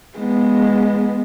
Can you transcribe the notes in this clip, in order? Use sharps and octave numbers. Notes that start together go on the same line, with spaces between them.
G#3 B3